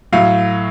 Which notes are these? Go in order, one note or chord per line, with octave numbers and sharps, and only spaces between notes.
A2 F#3 F5